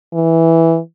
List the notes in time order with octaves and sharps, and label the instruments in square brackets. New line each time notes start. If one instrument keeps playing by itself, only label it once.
[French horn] E3